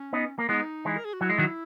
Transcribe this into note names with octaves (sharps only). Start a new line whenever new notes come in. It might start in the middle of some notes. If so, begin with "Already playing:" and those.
Already playing: C#4
B3 D#4
A#3
G#3 B3 D#4 E4
E3 G#3
A#4
G#4
F#4
F#3 E4
G#3
D#3 F#3